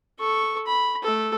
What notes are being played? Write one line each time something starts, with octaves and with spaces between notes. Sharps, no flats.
A4 C#6
B5
A3 A4